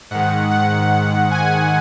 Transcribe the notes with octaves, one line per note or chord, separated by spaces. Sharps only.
G#2 D#3 F#5
F#5
G#5